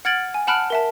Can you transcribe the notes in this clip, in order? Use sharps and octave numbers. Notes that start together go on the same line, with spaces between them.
F#5 F6 G#6 A6 D7 F#7
G#5
F#5 A5 B5 F6 F#6 D7
A#4 E5 A5